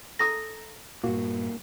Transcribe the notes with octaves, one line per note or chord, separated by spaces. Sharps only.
A4 A#5 D#6 A#6
G2 A#2 A#3 F#4